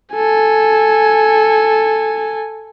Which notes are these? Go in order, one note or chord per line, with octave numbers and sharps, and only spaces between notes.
A4 G#5